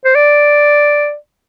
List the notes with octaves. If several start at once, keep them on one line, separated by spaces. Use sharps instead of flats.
C5
D5